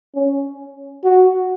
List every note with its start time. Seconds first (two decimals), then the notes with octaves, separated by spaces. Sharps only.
0.15 C#4
1.04 F#4